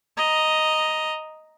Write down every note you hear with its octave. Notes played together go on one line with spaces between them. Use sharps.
D#5 A#5